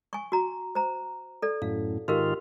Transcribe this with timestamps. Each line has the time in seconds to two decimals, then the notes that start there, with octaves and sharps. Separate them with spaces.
0.13 G#5 C#6
0.32 F#4 A#5
0.75 C5 A#5
1.42 A4 D5
1.62 F#2 A2 F5
2.08 G#2 D#3 F4 G4 A#4 F5